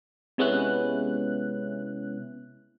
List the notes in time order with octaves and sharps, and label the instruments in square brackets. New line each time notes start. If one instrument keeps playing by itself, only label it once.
[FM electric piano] C3 G#3 B3 C#4 E4 F#6